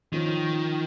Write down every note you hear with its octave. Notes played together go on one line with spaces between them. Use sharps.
D#3 F3 C#4 F4